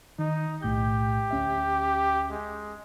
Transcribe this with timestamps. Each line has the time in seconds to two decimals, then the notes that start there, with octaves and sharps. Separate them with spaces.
0.19 D#3 D#4
0.62 B1 A2 G4 G6
1.31 D2 C#4 E5
2.31 G#3